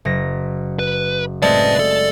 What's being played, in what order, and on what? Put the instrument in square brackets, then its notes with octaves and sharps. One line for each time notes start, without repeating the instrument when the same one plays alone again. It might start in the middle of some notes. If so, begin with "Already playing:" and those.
[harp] F#1 A#6
[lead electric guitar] B4
[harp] G#3 A3 C4 [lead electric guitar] B4 A5 [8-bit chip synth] D5
[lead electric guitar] A4